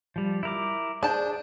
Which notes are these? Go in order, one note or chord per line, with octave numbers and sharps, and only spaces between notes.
F3 G3
E4 A#4 D6
D4 G#4 C5 A5